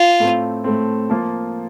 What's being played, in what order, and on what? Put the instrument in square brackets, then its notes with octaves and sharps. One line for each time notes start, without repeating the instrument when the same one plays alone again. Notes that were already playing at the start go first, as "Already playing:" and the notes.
Already playing: [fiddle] F4
[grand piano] A2 A3 C4
A2 A3 C4
F3 A#3 F4